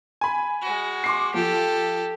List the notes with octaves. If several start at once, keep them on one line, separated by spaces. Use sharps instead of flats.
G#5 B5
G#3 F#4
C6 D6 C7
F3 G4 A4